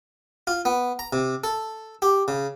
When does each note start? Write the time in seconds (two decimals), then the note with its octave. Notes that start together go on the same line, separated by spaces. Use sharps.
0.47 F4
0.65 B3
0.99 A#5
1.13 C3
1.44 A4
2.02 G4
2.28 C#3